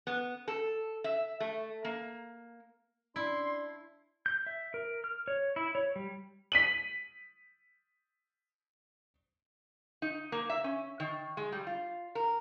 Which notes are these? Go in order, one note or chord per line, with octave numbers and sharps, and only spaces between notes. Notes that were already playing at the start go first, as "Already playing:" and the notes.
B3
A4
E5
A3
A#3
D4 E4 C6
G6
E5
A#4
F6
C#5
E4
C#5
G3
B6 D#7 F#7
D#4
A#3
E5
C#4
D#3
G#3
G3
F4
A#4